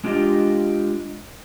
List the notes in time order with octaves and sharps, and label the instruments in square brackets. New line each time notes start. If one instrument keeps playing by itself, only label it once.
[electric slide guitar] G#3 D4 F4 G4 D#5